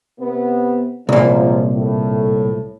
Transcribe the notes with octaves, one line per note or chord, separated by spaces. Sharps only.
C3 B3
C2 F#2 A#2 C#3 F3
A2